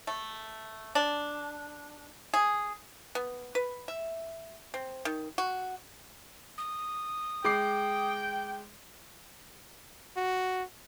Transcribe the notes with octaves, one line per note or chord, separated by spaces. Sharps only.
A3
D4
G#4
B3
B4
E5
C4
D#3
F#4
D#6
G#3 G5 D6 C7
F#4